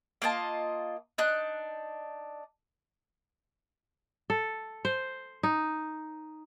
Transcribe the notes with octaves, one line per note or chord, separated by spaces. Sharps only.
A#3 F4 D#5 A5
D4 D#4 F#6
A4
C5
D#4